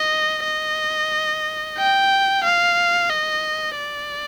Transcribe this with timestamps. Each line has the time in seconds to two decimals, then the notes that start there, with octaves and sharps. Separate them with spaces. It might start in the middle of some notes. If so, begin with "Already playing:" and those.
Already playing: D#5
0.45 D#5
1.77 G5
2.44 F5
3.10 D#5
3.77 D5